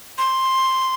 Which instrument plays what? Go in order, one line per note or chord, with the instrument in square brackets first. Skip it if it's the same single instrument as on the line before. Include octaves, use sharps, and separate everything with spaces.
[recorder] C6